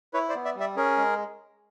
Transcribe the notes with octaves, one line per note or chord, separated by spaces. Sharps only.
E4 B4 C#5
C5 D5
B3
D5 E5
G3
D5 E5
C#4 G#4 A#4
G#3